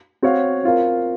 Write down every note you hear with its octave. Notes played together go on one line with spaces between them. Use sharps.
C4 F#4 C#5 F5
C4 F4 A#4 F5